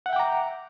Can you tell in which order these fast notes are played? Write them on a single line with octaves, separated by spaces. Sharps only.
F#5 E5 G5 D6 A#5